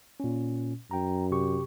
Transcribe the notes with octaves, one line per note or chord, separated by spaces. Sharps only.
A#2 C#4
F#2 G5 A#5
C3 G4 C#6